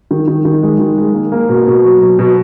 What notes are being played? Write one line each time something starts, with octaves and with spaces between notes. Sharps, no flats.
D#3
D#3
D#3
G#3
D#3
G#3
A#3
A#3
B2
B2
F#3
B2
B2